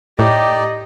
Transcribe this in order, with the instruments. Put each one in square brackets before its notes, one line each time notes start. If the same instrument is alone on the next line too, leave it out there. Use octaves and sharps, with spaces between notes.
[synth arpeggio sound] A2 [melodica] D#4 D5 [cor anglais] G4 [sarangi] D#5